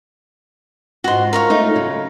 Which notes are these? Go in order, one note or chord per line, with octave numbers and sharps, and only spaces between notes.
G#2 F4 F#4 C6
A#4 C#5 F5
A3 D#4 F4
C#3 F#3